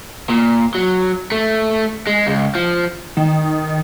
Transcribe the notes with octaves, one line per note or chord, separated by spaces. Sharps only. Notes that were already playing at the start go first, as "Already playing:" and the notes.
A#2
F#3
A3
G#3
C#2
F3
D#3